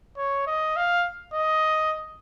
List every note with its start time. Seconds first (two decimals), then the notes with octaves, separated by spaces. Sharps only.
0.17 C#5
0.47 D#5
0.76 F5
1.34 D#5